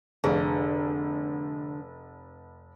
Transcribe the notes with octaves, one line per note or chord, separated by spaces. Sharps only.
F1 D3 G#4 B4 F5